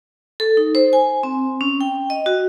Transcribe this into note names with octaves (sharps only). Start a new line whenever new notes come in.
A4
D#4
C5
G#5
C4
C#4
G5
D#5
F#4